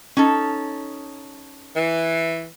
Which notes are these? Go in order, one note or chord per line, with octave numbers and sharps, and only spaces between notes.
C#4 D#4 A4
E3